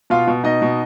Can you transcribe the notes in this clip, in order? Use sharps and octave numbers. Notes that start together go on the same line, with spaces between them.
B2 F4 F5
B2
B2 D#4 D#5
B2